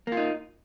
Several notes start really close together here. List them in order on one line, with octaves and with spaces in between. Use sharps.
A#3 F4 D#4